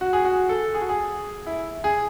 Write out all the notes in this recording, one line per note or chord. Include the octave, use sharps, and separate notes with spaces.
F#4
G#4
F#4
A4
G#4
F#4
G#4
E4
G#4